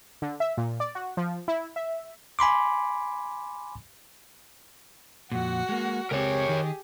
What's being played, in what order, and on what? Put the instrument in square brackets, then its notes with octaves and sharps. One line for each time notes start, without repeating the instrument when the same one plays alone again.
[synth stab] D3
E5
A#2
D5
F#4
F3
E4
E5
[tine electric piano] G#5 B5 C6 D6
[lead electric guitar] F2 A#2 [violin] F#4 F#5
[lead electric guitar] G#3 A#3
[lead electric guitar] C#2 C4 [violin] G4 G#4 [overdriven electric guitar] A#4 C#5
[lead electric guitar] D#3 D#4